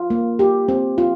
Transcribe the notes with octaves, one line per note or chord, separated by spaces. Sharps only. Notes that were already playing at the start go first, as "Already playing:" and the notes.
Already playing: F4
A#3
G4
C4
F4